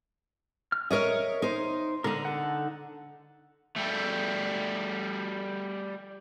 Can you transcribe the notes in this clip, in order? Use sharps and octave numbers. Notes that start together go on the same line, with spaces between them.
F6
A#4 C#5 D#5 E5
D#4 C5
D3 D#4 A#4 A#5
A4 F#5
G3 A3